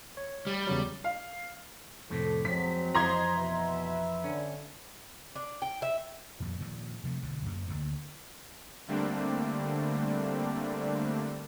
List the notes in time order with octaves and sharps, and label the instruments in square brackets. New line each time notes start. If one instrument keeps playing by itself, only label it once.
[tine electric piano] C#5
[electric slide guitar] G3
[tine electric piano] E2 C#3 F#3
[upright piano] F5
[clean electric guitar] F2 A2 C3 [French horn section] A4
[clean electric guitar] F2 [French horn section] F#3 G#3 C4 [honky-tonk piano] B6
[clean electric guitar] F2 E3 [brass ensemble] C5 D#5 [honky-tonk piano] A#5 C6 G#6
[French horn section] B2 [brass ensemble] B4 E5
[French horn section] D3 [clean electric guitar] C#4
[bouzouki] D4
G5
E5
[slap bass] F2 A#2 D#3
A#2 D#3 F3
C3 F3 G3 A3
B1 D3
F#2 A#3
D2 D3 A#3
[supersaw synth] D3 G3 A3 A#3 C4 D4